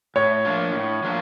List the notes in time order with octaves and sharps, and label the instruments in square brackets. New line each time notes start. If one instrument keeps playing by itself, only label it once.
[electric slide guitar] A2 [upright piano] C#5
[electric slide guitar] F3 A#3 D4 F4
A2
F3 A#3 D4 F4